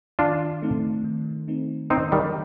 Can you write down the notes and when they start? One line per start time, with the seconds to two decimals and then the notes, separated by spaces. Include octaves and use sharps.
0.19 D#3 D4 F4
0.62 A3 C4 D#4
1.04 D#3
1.48 A3 C4 D#4
1.90 D#3 C4 D#4
2.12 D#3 G3